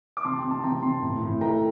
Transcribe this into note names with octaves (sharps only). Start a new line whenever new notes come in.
D6
C3 A5 C6
G5
C3
A5
C3 G5 A#5
C3 A5 C6
A2
A2
A3 G5 A#5